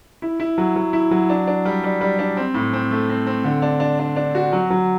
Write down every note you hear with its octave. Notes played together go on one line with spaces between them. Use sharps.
E4
E4
F#3
F#3
E4
F#3
D4
D4
G3
G3
G3
D4
C4
A2
C4
A3
C4
C4
D3
D4
D4
D4
D4
F#4
F#3
F#3